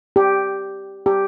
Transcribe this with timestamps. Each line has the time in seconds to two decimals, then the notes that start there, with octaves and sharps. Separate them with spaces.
0.16 G4
1.06 G4